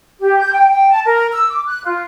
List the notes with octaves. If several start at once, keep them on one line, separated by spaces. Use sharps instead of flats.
G4
G6
G5
G5
A5
A#4
E6
D6
F#6
F4